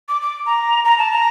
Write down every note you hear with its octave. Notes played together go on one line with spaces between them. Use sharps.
D6
D6
A#5
A#5
A5
A#5